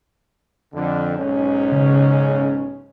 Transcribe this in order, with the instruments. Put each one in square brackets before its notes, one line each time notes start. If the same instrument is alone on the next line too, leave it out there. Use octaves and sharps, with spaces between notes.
[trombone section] F2 D3
B1 G#2 C#4
[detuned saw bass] C#3